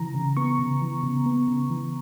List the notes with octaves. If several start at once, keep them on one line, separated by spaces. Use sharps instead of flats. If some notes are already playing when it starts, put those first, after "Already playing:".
Already playing: C#3 E3 A#5
C#3
B3 C#6
C#3
E3
C#3
B3
C#3
E3